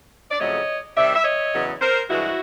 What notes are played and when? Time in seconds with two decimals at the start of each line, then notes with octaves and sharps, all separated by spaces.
0.31 D5
0.39 F2 C#3 F#3 A3 C#5 D#5
0.96 C3 D#3 G3 D5 E5
1.15 E5
1.25 C#5 D#5
1.53 E2 C#3 F#3 B3
1.81 A#4 C5
2.09 G2 E3 G#3 E4 F#4